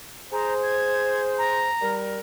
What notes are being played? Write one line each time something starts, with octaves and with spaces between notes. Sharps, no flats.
G#4 C5 A#5
G#6
A#5
G3 A#4